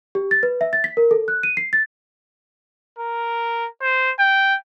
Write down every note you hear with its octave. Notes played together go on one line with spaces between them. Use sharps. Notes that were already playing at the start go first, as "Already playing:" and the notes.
G4
A6
B4
E5
A6
B6
A#4
A4
F#6
D#7
C7
A6
A#4
C5
G5